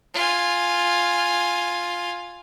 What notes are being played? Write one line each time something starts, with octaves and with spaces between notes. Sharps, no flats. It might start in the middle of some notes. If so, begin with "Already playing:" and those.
F4 G#5